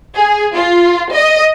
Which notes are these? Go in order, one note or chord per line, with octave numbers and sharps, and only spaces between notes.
G#4
F4
D#5